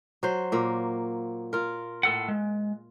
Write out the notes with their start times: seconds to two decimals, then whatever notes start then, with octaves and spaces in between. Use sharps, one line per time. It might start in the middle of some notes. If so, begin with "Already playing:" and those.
0.23 F#3 C5
0.52 A#2 A#3
1.53 F4 A#4
2.03 A2 A4 F#5
2.28 G#3